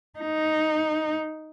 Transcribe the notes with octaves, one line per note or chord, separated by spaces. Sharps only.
D#4